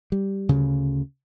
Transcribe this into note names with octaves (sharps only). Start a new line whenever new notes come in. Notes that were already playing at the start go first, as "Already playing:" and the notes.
G3
D2 C#3